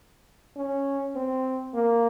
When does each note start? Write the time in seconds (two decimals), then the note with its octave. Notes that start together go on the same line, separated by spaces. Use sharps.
0.56 C#4
1.16 C4
1.74 A#3